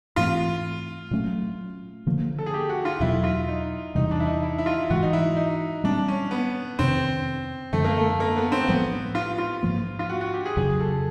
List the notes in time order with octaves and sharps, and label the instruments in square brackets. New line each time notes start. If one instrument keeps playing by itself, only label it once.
[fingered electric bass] G#2 E3 A3 C4 [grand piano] F4
[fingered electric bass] A#2 F#3 A3 C#4
D3 F3 A#3
[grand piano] A4
G#4
G4
F#4
F4
[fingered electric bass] E2 B2 F#3 [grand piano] E4
[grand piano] F4
D#4
[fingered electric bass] E2 C3 E3 G3 [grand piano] D#4
[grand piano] D4
E4
D#4
E4
E4
F4
[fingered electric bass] G#2 E3 G#3 [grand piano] F#4
[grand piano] D#4
E4
D#4
[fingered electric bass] A#2 G3 C4 [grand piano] D4
[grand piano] C#4
B3
[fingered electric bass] F2 C3 D#3 [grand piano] C4
[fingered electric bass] F#2 D3 F3 G#3 [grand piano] A3
[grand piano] A#3
A3
A#3
B3
C4
[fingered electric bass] A2 F3 G#3 [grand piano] B3
[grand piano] F4
F4
[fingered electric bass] G#2 F3 A#3
[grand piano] F4
F#4
F#4
G4
G#4
[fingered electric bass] F2 C#3 F#3 [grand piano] G#4
[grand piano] A4